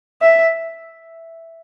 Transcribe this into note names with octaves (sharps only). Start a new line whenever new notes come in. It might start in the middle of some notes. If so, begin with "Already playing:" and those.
E5